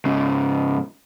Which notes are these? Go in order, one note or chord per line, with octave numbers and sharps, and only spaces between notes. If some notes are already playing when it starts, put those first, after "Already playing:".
G#2 C#3